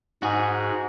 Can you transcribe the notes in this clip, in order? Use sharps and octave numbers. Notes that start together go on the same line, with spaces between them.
G#2 F#4 G#4